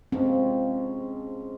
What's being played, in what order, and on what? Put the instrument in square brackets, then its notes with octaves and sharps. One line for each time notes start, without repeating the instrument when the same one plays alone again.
[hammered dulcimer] G#2 F3 G#3 C#4 [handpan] C4